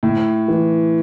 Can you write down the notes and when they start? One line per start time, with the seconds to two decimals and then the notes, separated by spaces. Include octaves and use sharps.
0.03 A2
0.48 E3